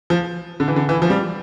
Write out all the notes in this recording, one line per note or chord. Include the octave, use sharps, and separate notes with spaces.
F3
D3
E3
D3
E3
F3
G3